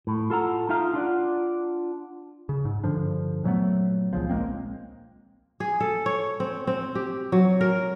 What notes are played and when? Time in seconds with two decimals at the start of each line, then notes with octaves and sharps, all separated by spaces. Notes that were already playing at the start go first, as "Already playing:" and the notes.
0.07 A2
0.30 F4 A4 F#5 A#5
0.69 D#4 F4 E5 F5
0.93 D4 F4 D5 F#5
2.49 C#3
2.65 G#2
2.84 G2 D3 F3 D4
3.44 A#2 F#3 A3 B3
4.13 C#2 C#3 F3
4.30 A#1 G#3 A#3 C4
5.60 G#4
5.80 A4
6.06 C#5
6.40 C4
6.67 C4
6.95 G4
7.32 F#3
7.61 A#4